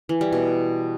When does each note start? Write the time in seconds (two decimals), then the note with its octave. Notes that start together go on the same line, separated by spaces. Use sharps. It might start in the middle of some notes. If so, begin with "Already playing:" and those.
0.09 E3
0.21 G3
0.32 B2